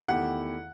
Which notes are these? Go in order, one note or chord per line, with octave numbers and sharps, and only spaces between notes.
E2 D#3 A3 E4 G4 F#5